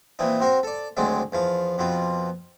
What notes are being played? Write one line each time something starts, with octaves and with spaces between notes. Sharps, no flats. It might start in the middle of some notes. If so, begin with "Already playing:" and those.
A#2 E3 C4 D#4
C4 F#4 A#4 C5
A4 D5
D2 D#3 F#3 G#3 C4 D5
E2 F3 F5
F2 B2 C4 F4